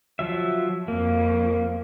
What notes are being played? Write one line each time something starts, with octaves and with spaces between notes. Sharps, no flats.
F3 F#3 E5
F2 A#3